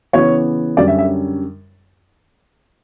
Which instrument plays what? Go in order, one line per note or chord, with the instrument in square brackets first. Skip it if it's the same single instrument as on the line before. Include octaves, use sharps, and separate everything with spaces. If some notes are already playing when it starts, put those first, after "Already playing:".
[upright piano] C#3 E3 B3 C#5
F#2 D3 G3 C#4 D5
E5
E5